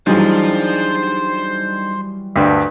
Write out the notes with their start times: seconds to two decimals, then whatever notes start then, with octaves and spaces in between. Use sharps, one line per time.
0.07 E3 F#3 G3 D4 D#4 G#4 C5 A5
2.36 D2 G2